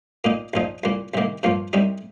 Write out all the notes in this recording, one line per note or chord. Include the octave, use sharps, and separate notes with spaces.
A#2 A#3 D#4
A#1 A#2 F3 D#4
C2 A#2 A#3
C2 C3 D#3 A#3
G2 F3 A#3 F4
C2 C3 G3 D#4